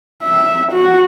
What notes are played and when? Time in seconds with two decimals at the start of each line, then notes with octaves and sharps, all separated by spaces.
0.24 E5
0.72 F#4